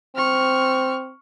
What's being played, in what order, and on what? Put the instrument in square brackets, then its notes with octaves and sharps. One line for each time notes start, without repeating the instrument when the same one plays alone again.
[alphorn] C4 [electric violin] C#6 F6